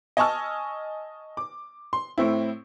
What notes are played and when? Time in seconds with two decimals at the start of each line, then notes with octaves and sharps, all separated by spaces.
0.17 D#5 G#5 A5 C#6 E6 F6
1.37 D6
1.93 C6
2.18 A2 C4 E4